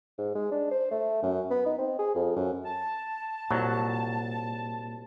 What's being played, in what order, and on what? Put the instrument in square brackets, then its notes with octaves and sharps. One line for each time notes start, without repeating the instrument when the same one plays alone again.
[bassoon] G#2
G#3
D4
C5
A3
F#2
B3
D#4
C4
G#4
F2
F#2
[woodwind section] A5
[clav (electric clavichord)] C2 F#3 [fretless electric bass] A#2